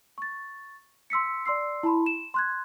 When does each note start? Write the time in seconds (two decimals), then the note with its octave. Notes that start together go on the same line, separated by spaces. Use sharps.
0.18 C#6 A6
1.10 C6 E6 B6 C#7
1.46 D5 C6 E6 C7
1.83 E4 A5 B5 C6
2.06 E7
2.34 C6 F#6 G#6